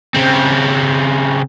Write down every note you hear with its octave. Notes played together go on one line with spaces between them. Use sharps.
C#3 C4